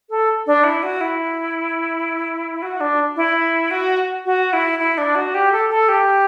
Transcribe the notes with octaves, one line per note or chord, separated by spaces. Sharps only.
A4
D4
E4
F#4
E4
F#4
D4
E4
F#4
F#4
E4
E4
D4
F#4
G4
A4
A4
G4